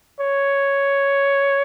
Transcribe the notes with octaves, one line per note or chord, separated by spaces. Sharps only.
C#5